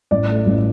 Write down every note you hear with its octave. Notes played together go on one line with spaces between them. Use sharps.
A1 D5
A3
A1